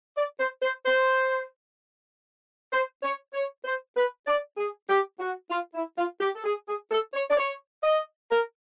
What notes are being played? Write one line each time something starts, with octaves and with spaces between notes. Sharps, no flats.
D5
C5
C5
C5
C5
C#5
C#5
C5
B4
D5
G#4
G4
F#4
F4
E4
F4
G4
A4
G#4
G#4
A4
C#5
D5
C#5
D#5
A#4